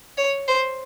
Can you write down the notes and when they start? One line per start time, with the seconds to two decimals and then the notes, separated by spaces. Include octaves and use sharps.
0.17 C#5
0.48 C5